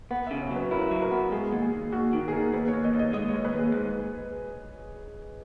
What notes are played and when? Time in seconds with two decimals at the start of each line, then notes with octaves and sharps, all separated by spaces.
0.11 B3 F#5
0.27 C#3 E5
0.41 C#5
0.51 F#3
0.56 B4
0.71 E4 A#4
0.91 F#3
1.02 A#4
1.11 B3
1.32 G#3 G#4
1.53 D#2
1.62 G#4
1.73 D#2
1.92 D#2 F#4
2.13 D#3
2.28 G#4
2.32 D#2 A#4
2.53 D#2 B4
2.68 C#5
2.74 D#2
2.84 D#5
2.94 D#2
2.99 D#5
3.13 G#3 D#5
3.28 C#5
3.34 D#2
3.45 B4
3.54 D#2 G#4
3.74 G#2